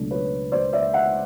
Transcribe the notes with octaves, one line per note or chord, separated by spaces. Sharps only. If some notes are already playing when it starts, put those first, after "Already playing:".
Already playing: C#2 B2 F#3 A3 D4
B4 C#5
C5 D5
D5 E5
E5 F#5